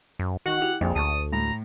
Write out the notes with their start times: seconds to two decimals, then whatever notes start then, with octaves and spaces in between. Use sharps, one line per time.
0.19 F#2
0.46 D#3 F#4 F#5
0.61 E4 G4 F7
0.81 A#1 F2 G5
0.96 D2 A5 C#6 D#6
1.32 A2 A#5